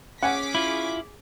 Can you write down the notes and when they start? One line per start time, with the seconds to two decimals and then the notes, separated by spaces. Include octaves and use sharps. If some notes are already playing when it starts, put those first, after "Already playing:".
0.23 C#4 G#4 F#5 G#5 D6 B6
0.55 E4 F4